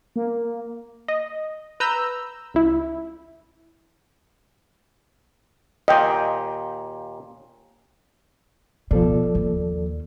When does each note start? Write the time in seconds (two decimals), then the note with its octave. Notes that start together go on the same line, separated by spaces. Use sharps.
0.16 A#3
1.08 D#5
1.80 B4 A#5 E6 G6
2.54 C#2 E4
5.88 D#2 A#2 D#5 G5
8.91 B2 F3 A4 D5
9.35 D#2